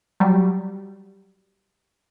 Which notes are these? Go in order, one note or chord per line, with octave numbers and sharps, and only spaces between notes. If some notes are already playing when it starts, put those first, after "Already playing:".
F#3 G3